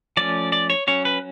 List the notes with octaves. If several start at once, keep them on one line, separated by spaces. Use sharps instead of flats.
F3 A3 C#4 D5
D5
C#5
F#3 C#4 C#5
B4